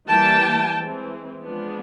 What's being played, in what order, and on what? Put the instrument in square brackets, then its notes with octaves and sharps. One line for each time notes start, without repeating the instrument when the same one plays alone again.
[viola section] E3 G3 A#3 G5 A5
E3 G#3 C4
F3 G#3 B3 D4